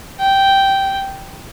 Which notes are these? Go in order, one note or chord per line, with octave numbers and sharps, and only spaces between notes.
G5